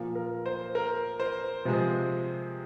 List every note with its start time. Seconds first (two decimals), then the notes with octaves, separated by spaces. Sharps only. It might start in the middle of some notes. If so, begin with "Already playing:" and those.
Already playing: A#2 F3 A#3
0.15 A#4
0.46 C5
0.75 A#4
1.20 C5
1.65 C3 F3 G#3 C4